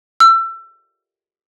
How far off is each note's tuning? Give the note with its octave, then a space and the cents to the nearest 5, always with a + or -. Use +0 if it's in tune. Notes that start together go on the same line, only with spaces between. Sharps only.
E6 +30